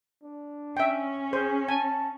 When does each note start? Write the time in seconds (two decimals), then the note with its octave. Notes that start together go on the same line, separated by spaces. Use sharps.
0.23 D4
0.77 C#4 E5 G5
1.33 G#4 C5
1.69 G#5 A5